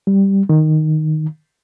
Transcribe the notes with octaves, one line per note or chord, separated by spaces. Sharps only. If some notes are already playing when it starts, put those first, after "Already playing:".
G3
D#3